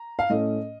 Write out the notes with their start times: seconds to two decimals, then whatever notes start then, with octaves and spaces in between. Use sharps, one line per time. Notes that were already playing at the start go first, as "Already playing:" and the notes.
Already playing: A#5
0.19 F5
0.30 A2 A3 C#4 D#5